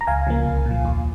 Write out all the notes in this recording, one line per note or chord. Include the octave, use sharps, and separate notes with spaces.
A#5
C#2 F5 G#5
C#3 F3 A#3
C2
A#2
F3
D#2